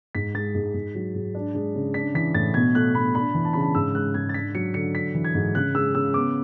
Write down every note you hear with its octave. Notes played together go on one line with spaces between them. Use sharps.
G#2 B6
G#3 A6
G#2
G#2
F#3
G#2
D4
G#3
C#3
D4 B6
E3 B6
A2 A6
B2 G#6
A3 F#6
B2 B5
D4 B5
E3
A5
C#3 B5
A5
G#2 E6
G#3 F#6
G#2 G#6
A6
D4 B6
F#3 C#7
D3 C#7
D4 B6
E3
G#6
G#2
C#3 F#6
G#3 E6
C#3 E6
B3 D6